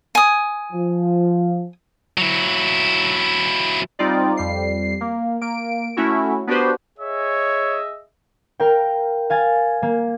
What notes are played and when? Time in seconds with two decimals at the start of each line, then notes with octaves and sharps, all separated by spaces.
0.15 G#5 D#6
0.73 F3
2.18 F#3 E4
3.99 G3 C4 D#4 F4 D5
4.37 F2 G3 C7
5.01 A#3
5.41 A#3 D7
5.97 A3 C#4 E4 F#4
6.47 B3 D4 F#4 G4 B4 C5
6.99 G#4 C#5 D#5 E5
8.60 A#4 F5 G5
9.30 F5 G#5 A6
9.82 A#3